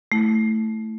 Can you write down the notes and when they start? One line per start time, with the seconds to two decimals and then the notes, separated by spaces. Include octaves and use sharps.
0.12 A3 E4